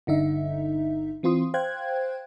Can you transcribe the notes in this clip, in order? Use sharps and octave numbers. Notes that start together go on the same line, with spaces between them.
G1 D3 D#4 E5
E3 C4 F4 C6 D#6
C5 F5 G5 F#6 G#6